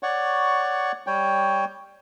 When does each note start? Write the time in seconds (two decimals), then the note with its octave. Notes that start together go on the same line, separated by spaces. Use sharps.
0.03 C#5 D5 F#5 C#6
1.07 G3 C#5 G5